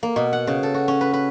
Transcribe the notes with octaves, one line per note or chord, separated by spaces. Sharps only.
A#3
B2
F#5
C#3
A4
F#4
C#4
B4
B4